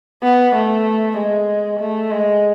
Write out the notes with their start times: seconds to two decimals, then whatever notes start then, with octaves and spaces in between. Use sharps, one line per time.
0.23 B3
0.55 A3
1.17 G#3
1.80 A3
2.11 G#3